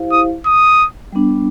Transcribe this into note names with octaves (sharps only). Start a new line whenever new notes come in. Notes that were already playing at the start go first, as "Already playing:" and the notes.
Already playing: E4 G4 C5 F5
D#6
D#6
G3 B3 D4